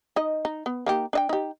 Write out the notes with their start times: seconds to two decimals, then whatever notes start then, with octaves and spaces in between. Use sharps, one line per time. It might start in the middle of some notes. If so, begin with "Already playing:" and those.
0.16 D#4 D#5
0.45 D#4
0.66 B3
0.86 A#3 D#4 G4
1.13 D4 D#5 G5
1.29 D#4 G4